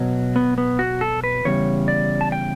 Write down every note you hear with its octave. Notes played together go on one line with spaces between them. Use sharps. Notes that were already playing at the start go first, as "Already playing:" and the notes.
Already playing: B2 F#3
B3
B3
F#4
A4
B4
E2 C#3 G3 C#5
D5
A5
G5